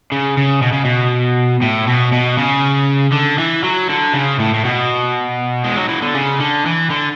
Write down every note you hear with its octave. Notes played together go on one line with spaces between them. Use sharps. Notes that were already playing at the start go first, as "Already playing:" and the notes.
C#3
C#3
B2
C#3
B2
A2
B2
B2
C#3
D3
E3
F#3
D3
C#3
A2
A2
B2
G#3
F#3
E3
D3
C#3
D3
E3
D3